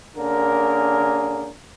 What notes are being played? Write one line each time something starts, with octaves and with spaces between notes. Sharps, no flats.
D3 A#3 C#4 D4 G#4 A#4